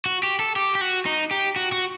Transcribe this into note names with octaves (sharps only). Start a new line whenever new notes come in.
F#4
G4
A4
G4
G4
F#4
D#4
G4
F#4
F#4